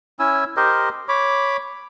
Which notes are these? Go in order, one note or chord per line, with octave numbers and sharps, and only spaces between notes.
C#4 E4 G#5 E6
G4 A#4 C5 D#5
C#5 B5 D6